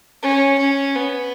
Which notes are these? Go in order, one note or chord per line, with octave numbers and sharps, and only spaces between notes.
C#4
C#4
B3